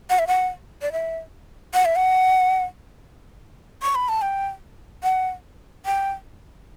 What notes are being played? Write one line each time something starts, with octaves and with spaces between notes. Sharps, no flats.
F#5
E5
F#5
D5
E5
F#5
E5
F#5
C#6
B5
A5
G5
F#5
G5